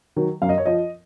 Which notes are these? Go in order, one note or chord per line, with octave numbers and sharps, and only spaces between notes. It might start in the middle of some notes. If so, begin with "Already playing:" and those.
D#3 F#3
F#2 F5
D#5
C#5
F3 D#5